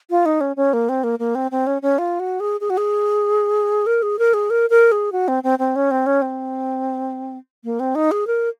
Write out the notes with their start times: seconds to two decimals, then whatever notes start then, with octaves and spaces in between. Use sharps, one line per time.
0.10 F4
0.26 D#4
0.41 C#4
0.56 C#4
0.73 A#3
0.89 C4
1.04 A#3
1.19 A#3
1.35 C4
1.51 C4
1.67 C#4
1.82 C#4
1.98 F4
2.20 F#4
2.40 G#4
2.61 G#4
2.70 F#4
2.77 G#4
3.86 A#4
4.03 G#4
4.19 A#4
4.34 G#4
4.50 A#4
4.70 A#4
4.92 G#4
5.12 F#4
5.28 C4
5.43 C4
5.59 C4
5.76 C#4
5.91 C4
6.06 C#4
6.22 C4
7.64 A#3
7.80 C4
7.95 D#4
8.11 G#4
8.27 A#4